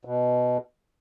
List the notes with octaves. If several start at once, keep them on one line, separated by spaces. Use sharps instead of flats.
B2